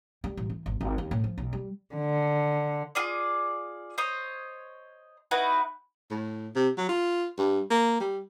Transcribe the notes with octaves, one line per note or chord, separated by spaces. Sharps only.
G3
A1
E3
G#1
G#1
D#2
A2
F3
B1
G3
D3
F4 G#4 D5
C5 C#5 D#5
D#4 E4 F#4 B4
A2
C3
F#3
F4
G2
A#3
G3